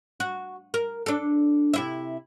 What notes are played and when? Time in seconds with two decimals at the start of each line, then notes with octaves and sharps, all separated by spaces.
0.20 F#4
0.74 A#4
1.06 D4 A4
1.74 C3 E4 E5